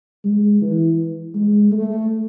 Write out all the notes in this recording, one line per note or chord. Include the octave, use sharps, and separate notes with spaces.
G#3
E3
G#3
A3